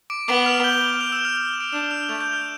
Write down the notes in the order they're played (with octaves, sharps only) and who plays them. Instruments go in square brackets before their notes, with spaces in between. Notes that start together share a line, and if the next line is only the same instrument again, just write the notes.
[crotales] D6 D7
[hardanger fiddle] B3 [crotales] D6 D7
[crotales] F6 F7
G6 G7
F6 F7
E6 E7
F6 F7
F6 F7
E7
D6 D7
[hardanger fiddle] D4 [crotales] E6 E7
[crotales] F6 F7
[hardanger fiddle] A3 [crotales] F6 F7
[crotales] G6 G7
F6 F7